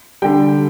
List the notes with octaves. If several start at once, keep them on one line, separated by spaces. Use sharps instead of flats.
D3 G3 G5